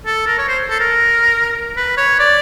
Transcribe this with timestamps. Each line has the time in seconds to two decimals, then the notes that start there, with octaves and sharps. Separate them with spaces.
0.06 A4
0.27 A#4
0.38 C#5
0.48 C5
0.70 A4
0.80 A#4
1.77 B4
1.97 C#5
2.19 D5